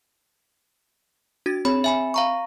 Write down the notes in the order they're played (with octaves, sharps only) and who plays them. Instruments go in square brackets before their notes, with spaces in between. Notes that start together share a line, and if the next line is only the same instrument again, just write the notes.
[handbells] D4 [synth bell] F#4 G#6 A6
[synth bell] C4 G#4 C#5 [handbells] B5
[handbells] E5 G#5 B5
F5 A#5 C#6